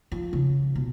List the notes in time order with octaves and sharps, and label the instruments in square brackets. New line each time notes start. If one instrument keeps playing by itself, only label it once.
[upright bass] F3
C#3
B2